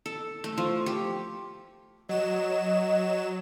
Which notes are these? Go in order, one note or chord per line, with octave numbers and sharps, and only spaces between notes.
A4
A3
F3
G4
F#3 D#5 E7